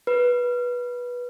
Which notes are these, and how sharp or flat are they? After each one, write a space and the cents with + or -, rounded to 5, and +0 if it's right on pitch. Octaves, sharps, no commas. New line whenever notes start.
B4 -15